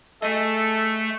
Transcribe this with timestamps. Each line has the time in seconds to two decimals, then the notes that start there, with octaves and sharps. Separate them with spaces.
0.22 A3 G#4 A4 D#5